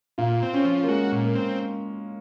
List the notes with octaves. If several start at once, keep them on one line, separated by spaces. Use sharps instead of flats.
A#2 F4
C4
C#4
F3
A#3
G#3 F#4
A#2
A#3
C4